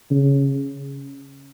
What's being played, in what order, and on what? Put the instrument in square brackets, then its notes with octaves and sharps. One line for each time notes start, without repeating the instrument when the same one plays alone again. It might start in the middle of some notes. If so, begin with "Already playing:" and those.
[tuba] C#3